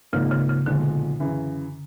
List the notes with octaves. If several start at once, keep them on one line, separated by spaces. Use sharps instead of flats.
G#1 G#2 C#3 F3 A#3 D#4
C#3
C#3
B1 A#2 D3 F3 G#3
F#2 C#3 E3